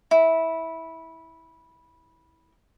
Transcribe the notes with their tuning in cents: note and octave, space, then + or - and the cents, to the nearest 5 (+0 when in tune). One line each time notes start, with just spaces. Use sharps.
E4 -15